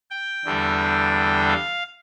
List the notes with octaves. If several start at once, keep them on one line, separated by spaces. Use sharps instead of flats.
G5
E2 D3 G3 D4
F5